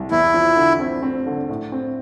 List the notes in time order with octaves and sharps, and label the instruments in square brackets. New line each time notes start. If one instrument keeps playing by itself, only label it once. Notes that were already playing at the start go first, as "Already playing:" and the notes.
Already playing: [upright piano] C2
[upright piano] E2 [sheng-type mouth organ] E4
[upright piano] F3
D3
C4
C4
D3
A2
C4